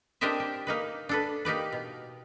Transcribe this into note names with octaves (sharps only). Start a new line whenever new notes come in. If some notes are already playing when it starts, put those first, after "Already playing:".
C4 D4 G4 A#4 D#5 E5
G4
A#3 D#4 B4
D4 A4 B4
A#3 D#4 G4 B4
B2